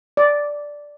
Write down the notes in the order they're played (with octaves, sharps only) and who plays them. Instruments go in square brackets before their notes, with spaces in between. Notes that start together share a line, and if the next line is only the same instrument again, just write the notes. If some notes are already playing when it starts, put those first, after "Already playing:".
[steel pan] D5